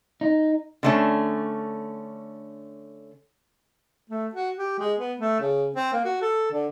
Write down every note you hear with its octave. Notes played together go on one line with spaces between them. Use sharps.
D#4
D3 A3 C#4
A3
F#4
G4
G#3
B3
A3
C#3
C4
A#3
F#4
A4
D3